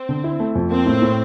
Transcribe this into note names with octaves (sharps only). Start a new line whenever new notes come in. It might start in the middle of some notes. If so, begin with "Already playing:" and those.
Already playing: C4
D3
E4
A3
F2
A#3 C4
A2
A2